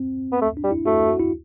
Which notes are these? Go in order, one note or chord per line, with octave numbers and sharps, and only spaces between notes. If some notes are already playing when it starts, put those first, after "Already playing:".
Already playing: C4
B3
A3
D4
G3
E4
A3 F#4
F#4
E4